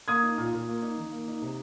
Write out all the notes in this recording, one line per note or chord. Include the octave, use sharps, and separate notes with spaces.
A#3 D#6 G#6
D#4
A#2
A#2
A#3
D#4
D#3
A#3
D#4
C3